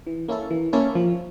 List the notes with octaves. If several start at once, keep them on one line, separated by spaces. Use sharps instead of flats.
E3
A#3 C#4 E4 A4
E3
A#3 C#4 E4 A4
F3